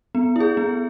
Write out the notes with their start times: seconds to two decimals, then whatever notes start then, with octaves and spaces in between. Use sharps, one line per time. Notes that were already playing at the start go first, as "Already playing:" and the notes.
0.15 B3
0.36 E4 G#4
0.57 B3